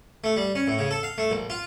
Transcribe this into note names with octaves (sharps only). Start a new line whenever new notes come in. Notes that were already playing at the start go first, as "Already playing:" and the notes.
A3
G3
C#4
A2
C#3
A4
F5
A3
A#1
F4